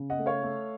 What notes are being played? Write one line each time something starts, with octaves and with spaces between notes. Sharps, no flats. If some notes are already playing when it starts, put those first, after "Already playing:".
Already playing: C#3
D#5 F#5
A3
C#5 F5
A3